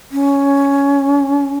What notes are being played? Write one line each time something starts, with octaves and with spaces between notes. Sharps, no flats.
C#4